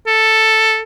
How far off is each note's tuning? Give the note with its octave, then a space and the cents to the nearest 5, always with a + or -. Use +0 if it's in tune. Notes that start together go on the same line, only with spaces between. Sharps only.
A4 +5